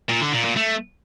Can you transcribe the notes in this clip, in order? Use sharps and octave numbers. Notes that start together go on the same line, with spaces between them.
A#2
D3
A#2
A#2
A3